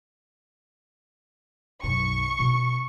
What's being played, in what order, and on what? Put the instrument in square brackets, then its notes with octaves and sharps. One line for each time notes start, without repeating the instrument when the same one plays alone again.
[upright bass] B1 F#2 [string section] C#6
[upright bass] B2 C#4